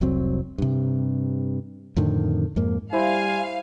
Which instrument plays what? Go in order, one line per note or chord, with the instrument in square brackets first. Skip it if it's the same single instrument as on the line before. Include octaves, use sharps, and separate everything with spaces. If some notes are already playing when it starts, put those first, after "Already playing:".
[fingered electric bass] F1 C2 F#3 C4
G2 C3
F2 A2 D3 D#3
F2 G#2 A#3
[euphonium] G3 [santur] E4 C5 D6 [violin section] F5 [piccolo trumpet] G#5